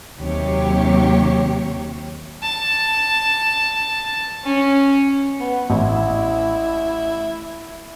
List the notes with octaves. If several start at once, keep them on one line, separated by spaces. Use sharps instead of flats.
D#2 C3 F#3 G4 C#5
A5
C#4
B3
A1 E4